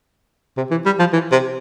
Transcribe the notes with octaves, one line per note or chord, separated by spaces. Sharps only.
C3
E3
G3
F3
E3
C3